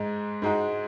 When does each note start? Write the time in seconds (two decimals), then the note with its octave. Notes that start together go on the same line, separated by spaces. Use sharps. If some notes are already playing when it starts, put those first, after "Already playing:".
Already playing: G#2 G#3 D#4
0.42 G#2 G#3 D#4 F#4